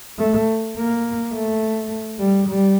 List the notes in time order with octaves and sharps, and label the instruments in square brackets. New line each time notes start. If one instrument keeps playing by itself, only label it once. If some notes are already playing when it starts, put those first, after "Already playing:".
[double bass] A3
A#3
A3
G3
G3